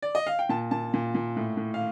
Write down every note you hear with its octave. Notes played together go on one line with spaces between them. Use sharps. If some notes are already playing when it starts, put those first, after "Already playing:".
D5
D#5
F5
G5
A#2 A5
A#2 A5
A#2
A#2
A2
A2
F5